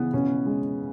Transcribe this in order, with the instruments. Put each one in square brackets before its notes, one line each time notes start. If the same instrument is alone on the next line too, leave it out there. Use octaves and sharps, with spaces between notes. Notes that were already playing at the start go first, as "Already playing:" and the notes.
Already playing: [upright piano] C#3 E3 [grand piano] B3
[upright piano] B2 [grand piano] C#4
[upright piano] G#3